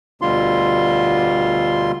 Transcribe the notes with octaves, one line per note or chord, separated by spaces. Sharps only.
D2 B2 D3 G3 F4 C6